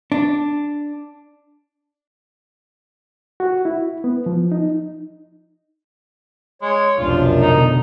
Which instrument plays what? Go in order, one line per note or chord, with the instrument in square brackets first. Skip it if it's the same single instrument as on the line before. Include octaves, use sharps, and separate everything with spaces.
[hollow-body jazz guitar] D4
[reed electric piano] F#4
E4
B3
F3
D#4
[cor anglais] G#3 [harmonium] C#5
[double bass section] F1 B1 [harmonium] F#2 F3 D4 [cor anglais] F4
[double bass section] B2 D3 [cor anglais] D#4